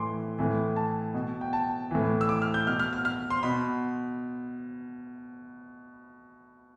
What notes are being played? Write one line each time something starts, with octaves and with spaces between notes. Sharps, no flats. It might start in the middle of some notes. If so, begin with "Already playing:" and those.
Already playing: A2 E3 C6 D6
A2 E3
A5
B2
G5
A5
A2 E3
E6
D6
F6
G6
B2 F6
F6
F6
F6
C6
B2 B5